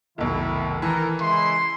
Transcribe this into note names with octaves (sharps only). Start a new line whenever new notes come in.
F1 B1 D#3 E4
E3 A4 A#4 A#5
C#3 G#3 E4 C6